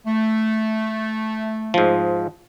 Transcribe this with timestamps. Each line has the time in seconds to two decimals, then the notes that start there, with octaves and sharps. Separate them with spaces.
0.07 A3
1.74 G#2 F3